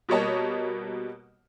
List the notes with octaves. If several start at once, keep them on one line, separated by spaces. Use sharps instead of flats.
B2 G3 A#3 C#5 D#5 A5